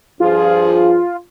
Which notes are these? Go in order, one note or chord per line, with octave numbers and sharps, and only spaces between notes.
G2 F3 F4 G#4